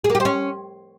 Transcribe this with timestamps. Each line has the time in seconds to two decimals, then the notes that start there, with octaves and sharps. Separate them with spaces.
0.04 G#4
0.10 A#3
0.15 G4
0.20 C5
0.25 C#4